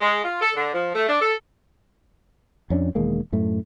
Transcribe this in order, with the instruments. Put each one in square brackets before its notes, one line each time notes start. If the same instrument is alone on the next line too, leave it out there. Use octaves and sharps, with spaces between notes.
[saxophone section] G#3
F4
A4
D3
F3
A3
D4
A4
[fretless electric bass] F2 C#4 D4
E1 D#3 G#3 A#3
F#2 A2 A3